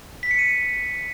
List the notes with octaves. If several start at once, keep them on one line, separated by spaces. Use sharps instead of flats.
B6
C#7
D#7